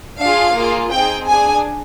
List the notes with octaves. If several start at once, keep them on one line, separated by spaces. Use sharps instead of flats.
D4 F4 G#4 F5
A#3 F4 G#4
C4 D#4 G#4 G5
D4 G#4 G#5